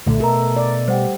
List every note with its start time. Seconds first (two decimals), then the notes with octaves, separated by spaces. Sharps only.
0.07 B1 A#2 D3 A3
0.20 B2 A4 A#4 A#5
0.56 D5
0.88 G3 C5 F#5 G5